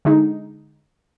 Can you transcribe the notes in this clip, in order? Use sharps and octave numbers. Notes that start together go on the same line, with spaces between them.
D3 G#3 D#4